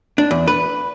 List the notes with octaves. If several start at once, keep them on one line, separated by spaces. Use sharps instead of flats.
D4
E2
B4